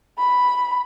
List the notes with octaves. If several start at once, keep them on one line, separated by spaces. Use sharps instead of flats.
B5